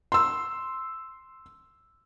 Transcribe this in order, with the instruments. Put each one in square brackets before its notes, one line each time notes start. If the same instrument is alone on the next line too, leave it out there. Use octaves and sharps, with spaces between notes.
[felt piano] C6 E6